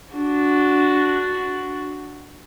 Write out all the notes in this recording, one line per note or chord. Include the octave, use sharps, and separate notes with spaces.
D4 F#4